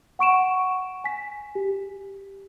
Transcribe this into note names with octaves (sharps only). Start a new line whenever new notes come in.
F#5 C#6 D7 E7
G#5 B6
G4